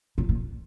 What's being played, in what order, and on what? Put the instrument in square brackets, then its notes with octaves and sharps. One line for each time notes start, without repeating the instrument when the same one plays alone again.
[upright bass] A#2
A#2